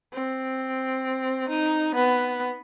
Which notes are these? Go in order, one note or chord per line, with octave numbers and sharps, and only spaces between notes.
C4
D#4
B3